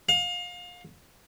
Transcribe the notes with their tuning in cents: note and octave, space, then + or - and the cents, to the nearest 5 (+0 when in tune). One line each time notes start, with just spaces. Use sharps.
F5 +30